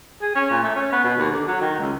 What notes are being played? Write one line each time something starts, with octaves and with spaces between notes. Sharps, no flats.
G#4
C#4
A#2
A3
C#4
B3
B2
D#2
D3
F#3
D#3
C#2